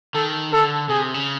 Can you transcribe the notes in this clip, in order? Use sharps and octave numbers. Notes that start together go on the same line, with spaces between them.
D#3 A4
D3 A4
C3 G#4
C#3